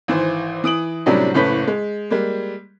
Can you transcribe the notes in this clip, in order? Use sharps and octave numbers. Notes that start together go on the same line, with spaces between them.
G#1 E3 C5
E3 D#6 D7 F#7
A2 C3 F#3 G3 C#4 D4
F#1 A2 C#4 B4 G6 B6
G#3
G3 G#3 A#3